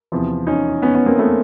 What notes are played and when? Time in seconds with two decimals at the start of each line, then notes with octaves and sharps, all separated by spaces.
0.12 E2 C3 F3
0.47 C#4 D#4
0.82 B3 C#4
0.95 B3 C#4
1.06 A#3 C4
1.19 A3 B3